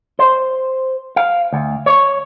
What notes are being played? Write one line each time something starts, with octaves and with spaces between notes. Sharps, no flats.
C5
F5
D2
C#5